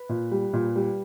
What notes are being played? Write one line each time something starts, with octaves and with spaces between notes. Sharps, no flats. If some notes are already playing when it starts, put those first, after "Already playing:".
Already playing: B4
A#2
G3
A#2
G3